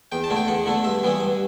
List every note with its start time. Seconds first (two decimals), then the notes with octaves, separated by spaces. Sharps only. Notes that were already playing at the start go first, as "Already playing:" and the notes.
0.12 E2 G5
0.24 A5
0.30 D3 A3 E4
0.36 G5
0.48 E2 F#5
0.66 D3 A3 E4
0.84 G2 E5
1.03 E3 G3 B3 E4
1.20 G2